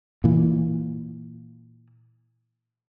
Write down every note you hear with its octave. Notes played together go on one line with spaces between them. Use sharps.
A#2 E3